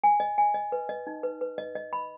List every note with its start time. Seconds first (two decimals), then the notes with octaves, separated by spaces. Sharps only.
0.04 G#5
0.20 D#5
0.38 G#5
0.54 D#5
0.72 B4
0.89 D#5
1.07 D#4
1.23 B4
1.41 B4
1.58 D#5
1.75 D#5
1.93 B5